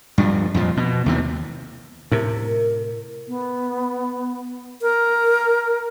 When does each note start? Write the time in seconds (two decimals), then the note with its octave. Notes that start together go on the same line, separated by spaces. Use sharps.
0.18 G2 F3
0.54 F2 A#2 F3
0.77 B2
1.06 D#2 C3 E3
2.12 A2 C3 A#4
3.28 B3
4.82 A#4